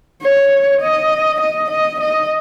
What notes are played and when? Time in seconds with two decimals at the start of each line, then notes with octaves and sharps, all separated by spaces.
0.22 C#5
0.81 D#5
1.41 D#5
1.70 D#5
2.00 D#5